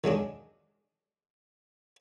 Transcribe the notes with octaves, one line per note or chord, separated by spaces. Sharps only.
D#3 F#3 G#3 D4